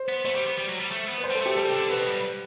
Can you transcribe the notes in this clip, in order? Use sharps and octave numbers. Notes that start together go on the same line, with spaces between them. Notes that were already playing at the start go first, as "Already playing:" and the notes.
Already playing: C5
B3
A3 C5
G3
B3
G3
F#3
G3
A3
B3
B4
C5
G3 A4
A3 G4
G3 A4
C3
D3
B2 B4
G2